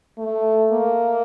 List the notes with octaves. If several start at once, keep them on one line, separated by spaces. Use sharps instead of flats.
A3
A#3